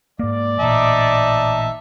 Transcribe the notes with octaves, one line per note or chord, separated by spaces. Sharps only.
G#2 A#3 D5
A1 A#2 D#4 E5 A5